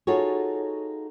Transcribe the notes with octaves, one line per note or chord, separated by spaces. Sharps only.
D#4 F4 F#4 G#4 A4 C#5